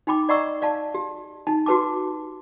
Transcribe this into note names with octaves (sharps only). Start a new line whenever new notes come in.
D#4 G5 B5 D6
D5 D#5 F#5 A#5 C#6 E6
D5 F5 A5
G4
D#4 A5
F#4 G4 B4 A5 D6